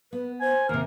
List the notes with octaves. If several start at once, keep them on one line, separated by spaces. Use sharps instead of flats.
B3 B4
C5 G#5
D#2 C3 A#4